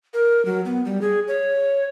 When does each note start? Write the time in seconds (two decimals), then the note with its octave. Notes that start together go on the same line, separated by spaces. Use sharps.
0.14 A#4
0.45 F#3
0.65 B3
0.85 G3
1.01 G#4
1.28 C#5